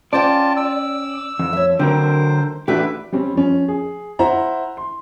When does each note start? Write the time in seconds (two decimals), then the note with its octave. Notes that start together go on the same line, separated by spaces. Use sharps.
0.13 C#4 F4 C5 D5 G5 A5
0.57 E6
1.39 F2
1.53 C#5 E5
1.79 D3 F#3 C4 A#4 C5
2.68 F2 E3 A3 D4 F#4 G4 B4 E5
3.12 G3 C4 C#4
3.35 F3 C#4
3.68 G#4
4.19 E4 C5 E5 F#5 A#5
4.77 C6